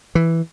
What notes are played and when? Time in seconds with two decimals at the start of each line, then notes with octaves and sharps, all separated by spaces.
0.15 E3